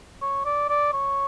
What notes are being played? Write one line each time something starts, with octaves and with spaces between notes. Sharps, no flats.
C#5
D5
D5
C#5